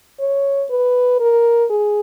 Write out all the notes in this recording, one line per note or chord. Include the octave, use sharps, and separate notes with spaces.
C#5
B4
A#4
G#4